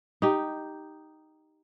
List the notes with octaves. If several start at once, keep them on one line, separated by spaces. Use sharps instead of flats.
D#4 G4